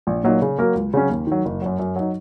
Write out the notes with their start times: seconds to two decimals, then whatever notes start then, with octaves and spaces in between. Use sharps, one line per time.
0.07 A#1
0.24 A#2 F#3 A#3 D#4
0.42 C#3
0.58 F#3 A#3 F#4 A#4
0.75 C#2
0.94 C#3 F#3 C#4
1.10 D#2
1.27 D#3 F#3
1.45 F#1
1.62 F#2 F#3
1.79 F#2
1.96 F#3 D#4